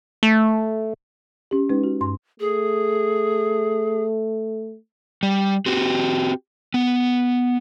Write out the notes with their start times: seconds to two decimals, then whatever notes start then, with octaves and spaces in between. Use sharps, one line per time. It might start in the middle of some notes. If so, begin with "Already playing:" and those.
0.23 A3
1.51 C#4 G4
1.69 G#3 C#4 D#4 B4
1.84 F#4
2.01 G2 C6
2.40 A3 G#4
5.23 G3
5.66 C4 F#4 G4
6.74 B3